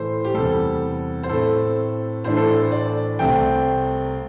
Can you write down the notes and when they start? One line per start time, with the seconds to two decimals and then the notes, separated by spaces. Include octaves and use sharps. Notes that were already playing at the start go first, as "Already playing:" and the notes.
Already playing: A2 E3 A3 C5
0.25 G4
0.34 E2 C3 G3 A4
1.23 C5
1.29 A2 A3 C4 A4
2.24 A2 E3 A3 D4 C5
2.37 A4
2.50 C5
2.72 D5
3.19 C2 C3 A3 C4 G5